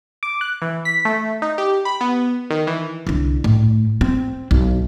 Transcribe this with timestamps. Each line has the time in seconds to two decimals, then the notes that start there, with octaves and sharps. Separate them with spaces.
0.23 D6
0.41 F#6
0.62 E3
0.85 B6
1.05 A3
1.42 D#4
1.58 G4
1.85 B5
2.01 B3
2.51 D#3
2.67 E3
3.07 C2 D3
3.44 A2
4.01 C4
4.51 B1